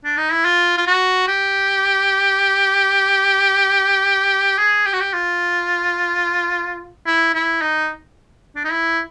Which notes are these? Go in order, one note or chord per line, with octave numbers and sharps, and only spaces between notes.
D4
D#4
E4
F4
F4
F#4
G4
G#4
G4
F#4
G4
F4
E4
E4
D#4
D4
D#4
E4